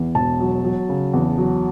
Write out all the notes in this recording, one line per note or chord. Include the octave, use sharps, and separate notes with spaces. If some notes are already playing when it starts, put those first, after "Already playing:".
Already playing: E2
E1 A5
F#3
F#3
C#3
E2
F#3